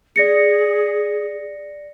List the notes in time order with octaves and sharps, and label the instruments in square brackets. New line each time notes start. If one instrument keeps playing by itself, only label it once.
[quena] G#4 [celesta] D5 A#6 C#7